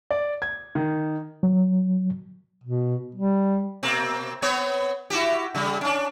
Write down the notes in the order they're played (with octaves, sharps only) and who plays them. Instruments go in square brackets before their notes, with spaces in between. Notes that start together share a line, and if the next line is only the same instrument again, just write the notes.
[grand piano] D5
G#6
D#3
[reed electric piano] F#3
[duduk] B2
G3
[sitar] B2 A#3 C4
B3 C4 C#5
E4 F#4 G4
C#3 G3
C#4 D4